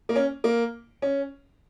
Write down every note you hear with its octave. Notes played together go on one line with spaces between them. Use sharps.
A#3
C#4
A#3
C#4